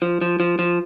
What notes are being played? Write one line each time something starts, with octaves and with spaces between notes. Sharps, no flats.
F3
F3
F3
F3